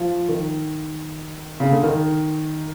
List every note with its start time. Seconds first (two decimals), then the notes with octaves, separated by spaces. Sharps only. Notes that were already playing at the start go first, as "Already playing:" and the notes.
Already playing: F3
0.29 D#3
1.60 C#3
1.71 D3
1.83 D#3